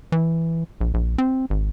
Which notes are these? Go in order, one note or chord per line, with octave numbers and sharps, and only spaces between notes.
E3
A#1
A#1
C4
G#1